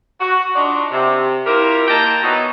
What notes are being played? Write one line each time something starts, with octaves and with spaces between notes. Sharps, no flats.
F#4
D4 D#4 F4 F#4 D5
C3
E4 F4 G4 A#4
A#3 D#5 G5 A5 A#5
B2 F#3 B3 D#4 E4 F#4